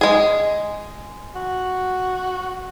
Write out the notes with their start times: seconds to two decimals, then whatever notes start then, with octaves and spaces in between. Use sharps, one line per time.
0.01 G#3 G#4
1.36 F#4